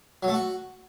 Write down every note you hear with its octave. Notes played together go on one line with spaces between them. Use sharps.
F#3
A3
F#4